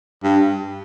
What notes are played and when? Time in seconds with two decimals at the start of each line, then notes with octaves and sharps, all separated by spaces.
0.23 G2